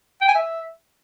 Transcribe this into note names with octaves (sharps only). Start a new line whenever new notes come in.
G5
G#5
E5